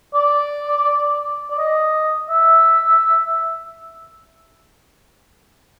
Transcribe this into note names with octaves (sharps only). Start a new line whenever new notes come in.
D5
D5
D#5
E5